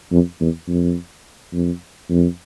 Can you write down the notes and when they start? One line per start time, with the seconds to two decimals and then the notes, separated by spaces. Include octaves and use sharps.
0.12 F2
0.41 E2
0.69 F2
1.53 F2
2.09 F2